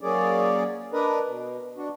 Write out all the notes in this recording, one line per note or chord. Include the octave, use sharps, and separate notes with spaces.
F#3 A#3 C#4 G#4 D5
D4 A#4 B4 D#5
B2
D4 F#4